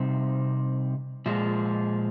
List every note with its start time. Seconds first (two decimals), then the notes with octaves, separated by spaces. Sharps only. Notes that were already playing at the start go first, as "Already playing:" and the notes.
Already playing: C3 G3 C4 D#4
1.26 A#2 F3 G#3